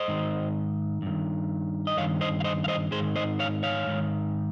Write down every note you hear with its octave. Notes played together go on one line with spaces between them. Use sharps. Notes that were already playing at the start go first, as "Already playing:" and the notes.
Already playing: C5 D#5
G#2 D#3
G2 D#3
D#5
G2 D#3 C#5 F5
C5 D#5
F5
C5 D#5
F5
C5 D#5
G#2 D#3 G#4 C5
C5 D#5
C#5 F5
C#5 F5
G#2 D#3